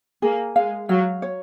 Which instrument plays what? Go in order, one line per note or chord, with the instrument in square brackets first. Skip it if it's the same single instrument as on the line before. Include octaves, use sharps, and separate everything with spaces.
[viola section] A#3 [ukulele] G#4
[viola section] G#3 [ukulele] F5
[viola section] F#3 [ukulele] F5
[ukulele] C#5